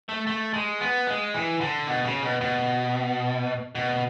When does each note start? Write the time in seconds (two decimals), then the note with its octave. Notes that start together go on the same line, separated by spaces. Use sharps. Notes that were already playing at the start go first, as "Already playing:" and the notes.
0.09 A3
0.27 A3
0.54 G#3
0.81 B3
1.07 G#3
1.34 E3
1.61 D3
1.87 B2
2.05 C#3
2.23 B2
2.41 B2
3.75 B2